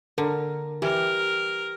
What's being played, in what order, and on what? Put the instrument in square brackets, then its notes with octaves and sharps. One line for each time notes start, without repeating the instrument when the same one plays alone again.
[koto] D3 [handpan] A#4
[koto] E3 [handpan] G4 [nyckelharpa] A#4